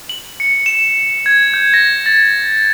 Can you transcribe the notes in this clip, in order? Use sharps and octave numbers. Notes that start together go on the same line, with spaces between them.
F#7
C#7
E7
G#6
G6
A#6
A6